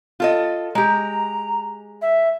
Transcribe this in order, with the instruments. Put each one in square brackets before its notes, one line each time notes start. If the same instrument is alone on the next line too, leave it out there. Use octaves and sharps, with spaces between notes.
[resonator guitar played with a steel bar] F4 A4 D#5
[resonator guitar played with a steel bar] G#3 G4 [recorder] A#5
[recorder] E5